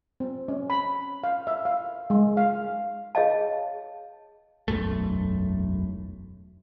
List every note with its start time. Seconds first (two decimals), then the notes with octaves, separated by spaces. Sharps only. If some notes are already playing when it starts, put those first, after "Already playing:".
0.20 C4
0.48 C#4
0.70 B5
1.24 F5
1.47 E5
1.65 F5
2.10 G#3
2.37 F5
3.15 G#4 C#5 D#5 F5 A5
4.68 E1 B1 F#2 A3